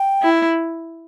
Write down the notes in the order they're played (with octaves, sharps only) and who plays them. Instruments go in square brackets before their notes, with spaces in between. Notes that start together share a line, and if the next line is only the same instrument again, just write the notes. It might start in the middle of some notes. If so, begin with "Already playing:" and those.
Already playing: [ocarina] G5
[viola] E4